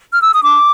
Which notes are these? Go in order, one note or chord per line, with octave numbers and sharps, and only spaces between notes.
F6
E6
D#6
D4 D6